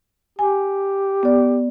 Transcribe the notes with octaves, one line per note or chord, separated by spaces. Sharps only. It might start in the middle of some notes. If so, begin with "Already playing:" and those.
G4 G#5
B3 D5